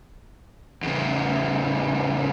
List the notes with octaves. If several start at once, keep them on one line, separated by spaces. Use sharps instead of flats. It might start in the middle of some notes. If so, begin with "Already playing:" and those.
E2 C#3